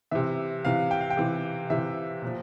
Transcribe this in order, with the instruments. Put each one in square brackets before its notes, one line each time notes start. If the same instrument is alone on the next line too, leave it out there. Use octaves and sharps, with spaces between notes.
[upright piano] C3 E3 E5
C3 E3 F5
G5
F5
G5
C3 E3
C3 E3 E5
A#2 F3